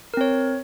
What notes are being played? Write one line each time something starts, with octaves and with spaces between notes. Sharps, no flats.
C4 A#4 C#5